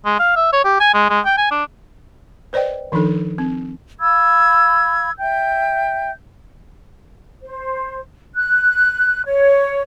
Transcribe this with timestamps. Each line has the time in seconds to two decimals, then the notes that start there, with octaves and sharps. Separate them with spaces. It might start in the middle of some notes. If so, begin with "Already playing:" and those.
0.05 G#3
0.19 F5
0.36 E5
0.53 C#5
0.65 G4
0.81 G#5
0.94 G#3
1.10 G#3
1.25 G5
1.38 G#5
1.51 D4
2.53 B4 C5 D5 D#5 G5
2.92 D#3 F3 D4 D#4 A4
3.38 C4
4.00 F5 B5 E6 G#6
5.19 E5 G5 G6
7.42 C5
8.36 F#6
9.26 C#5